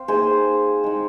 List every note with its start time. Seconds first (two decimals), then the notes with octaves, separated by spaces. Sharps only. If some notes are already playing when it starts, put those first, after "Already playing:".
Already playing: C4 F5
0.08 A#3 D#4 G#4 C5
0.84 G#3 D#4